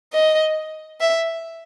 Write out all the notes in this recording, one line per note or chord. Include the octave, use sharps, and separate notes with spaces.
D#5
E5